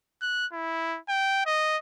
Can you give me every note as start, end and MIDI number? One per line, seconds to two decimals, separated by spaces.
0.22 0.47 90
0.52 0.98 64
1.09 1.45 79
1.46 1.77 75